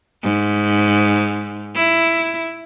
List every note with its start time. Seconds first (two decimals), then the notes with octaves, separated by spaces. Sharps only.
0.23 G#2
1.75 E4